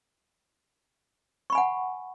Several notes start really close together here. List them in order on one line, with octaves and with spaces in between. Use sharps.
C#6 B5 G#5 F#5